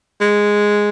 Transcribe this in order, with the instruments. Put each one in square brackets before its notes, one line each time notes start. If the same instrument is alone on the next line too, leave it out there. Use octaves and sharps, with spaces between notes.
[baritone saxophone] G#3